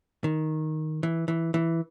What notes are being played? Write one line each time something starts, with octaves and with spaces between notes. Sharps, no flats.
D#3
E3
E3
E3